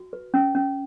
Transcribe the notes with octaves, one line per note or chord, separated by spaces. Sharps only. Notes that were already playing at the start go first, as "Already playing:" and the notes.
Already playing: F#4
B4
C#4
C#4